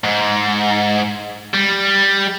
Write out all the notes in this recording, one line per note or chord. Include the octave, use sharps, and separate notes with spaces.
G#2
G3